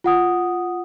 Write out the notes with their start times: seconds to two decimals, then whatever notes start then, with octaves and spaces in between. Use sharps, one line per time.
0.04 F4 F#5 D#6